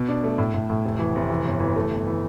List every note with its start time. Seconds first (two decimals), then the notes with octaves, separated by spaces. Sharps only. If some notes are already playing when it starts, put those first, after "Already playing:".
Already playing: B2
0.09 D4
0.24 A3
0.38 A2
0.54 A2
0.70 A2
0.85 F1
0.99 E3
1.15 F1
1.30 E3
1.45 G1
1.60 E3
1.76 A3
1.91 G1
2.07 E3